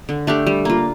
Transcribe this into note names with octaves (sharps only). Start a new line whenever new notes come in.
D3
A3 D4 G4
G3
A#3 F4